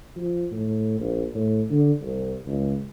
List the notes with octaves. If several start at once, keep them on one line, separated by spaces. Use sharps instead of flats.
F3
A2
A#1
A2
D3
C2
C#2